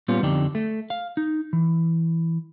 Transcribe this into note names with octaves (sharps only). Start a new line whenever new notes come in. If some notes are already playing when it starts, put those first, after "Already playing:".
A#2 G3 B3 C#4 F4
F2 D3 D4 D#4 G4
A3
F5
D#4
E3